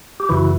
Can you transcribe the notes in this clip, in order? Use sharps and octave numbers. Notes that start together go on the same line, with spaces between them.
G4
F#2 C#3 E3 E4 F#4